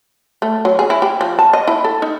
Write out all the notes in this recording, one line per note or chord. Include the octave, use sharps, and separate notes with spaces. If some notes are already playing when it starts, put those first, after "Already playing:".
A3
F#3
G#4
E4
G4
F3
A5
D#5
E4
A4
D#4